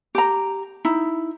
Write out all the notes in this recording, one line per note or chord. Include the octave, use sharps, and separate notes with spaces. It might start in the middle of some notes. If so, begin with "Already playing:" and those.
G4 A#5
D#4 E4